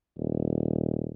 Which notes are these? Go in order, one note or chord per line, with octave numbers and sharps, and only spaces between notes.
D#1